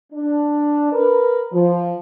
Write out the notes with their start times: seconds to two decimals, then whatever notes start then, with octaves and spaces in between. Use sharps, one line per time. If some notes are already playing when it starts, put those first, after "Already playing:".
0.13 D4
0.93 A#4 B4
1.53 F3